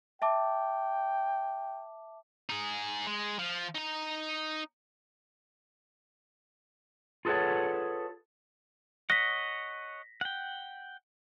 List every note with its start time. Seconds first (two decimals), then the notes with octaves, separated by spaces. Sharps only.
0.22 E5 G5 A5 D6
2.50 D#4 G#4
3.07 G#3
3.39 F3
3.75 D#4 A#5
7.25 F4 G#4 A4 B4 C#5 F#5
9.10 C#5 D#5 F#5 A#6 B6
10.21 F#5 G5